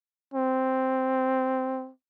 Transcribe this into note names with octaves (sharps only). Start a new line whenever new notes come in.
C4